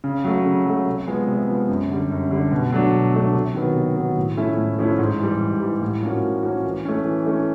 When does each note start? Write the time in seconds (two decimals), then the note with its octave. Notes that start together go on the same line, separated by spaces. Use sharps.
0.04 C#3
0.24 F#3 A3
0.45 C#3
0.66 F#3 A3
0.86 C3
1.07 F3 G#3 B3
1.27 C3
1.48 F3 G#3 B3
1.69 F#2
1.90 D3 G3
2.11 F#2
2.31 D3 G3
2.52 B2
2.72 F#3 A3 D4
2.92 B2
3.13 F#3 A3 D4
3.34 C3
3.55 D#3 F#3 B3
3.75 C3
3.96 D#3 F#3 B3
4.17 A2
4.37 F3 A3 C#4 E4
4.58 A2
4.79 F3 A3 C#4 E4
4.99 G#2
5.20 E3 G3
5.41 G#2
5.61 E3 G3
5.82 A2
6.03 F3 A#3 C#4 F#4
6.23 A2
6.43 F3 A#3 C#4 F#4
6.64 E3
6.85 A3 C#4
7.05 E3
7.26 A3 C#4